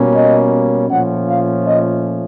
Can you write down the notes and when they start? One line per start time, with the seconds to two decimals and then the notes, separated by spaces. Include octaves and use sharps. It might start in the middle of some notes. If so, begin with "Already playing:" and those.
Already playing: B2 G3 A#3 C#4
0.13 D#5
0.88 A#2 F3 A3 C#4 F#5
1.25 F5
1.64 D#5